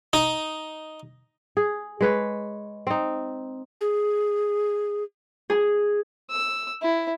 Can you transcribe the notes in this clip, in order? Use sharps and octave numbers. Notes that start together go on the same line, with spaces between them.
D#4
G#4
G#3 B4 C#5
C4 D#4
G#4
G#4
E6
E4